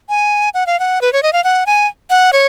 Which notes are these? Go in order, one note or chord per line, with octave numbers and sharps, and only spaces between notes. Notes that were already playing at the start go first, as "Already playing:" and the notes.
G#5
F#5
F5
F#5
B4
C#5
D#5
F5
F#5
G#5
F#5
C#5